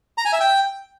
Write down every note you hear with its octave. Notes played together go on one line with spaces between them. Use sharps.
A#5
G#5
E5
G5